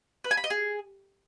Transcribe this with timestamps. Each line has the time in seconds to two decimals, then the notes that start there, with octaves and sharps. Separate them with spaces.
0.24 B4
0.31 G#5
0.37 B5
0.44 D#5
0.50 G#4